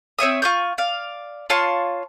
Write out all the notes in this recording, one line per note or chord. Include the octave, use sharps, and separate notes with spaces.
C4 C#5 E5 D#6
F4 C#6 G6
D5 F5
F4 C#5 A5 C6